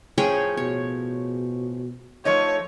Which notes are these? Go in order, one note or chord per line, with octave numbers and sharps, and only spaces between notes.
A2 F3 C#4 G#4 C#5 G5
B2 C#5
F3 A3 D#4 C#5